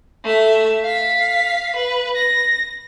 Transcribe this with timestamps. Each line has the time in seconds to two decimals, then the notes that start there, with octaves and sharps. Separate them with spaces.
0.24 A3 E5
0.83 F5 B6
1.76 B4
2.15 A#6